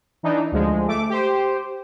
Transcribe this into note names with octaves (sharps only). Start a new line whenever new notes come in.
E3 D4 D#4
D2 F3 G#3
A3 D6
G4 C5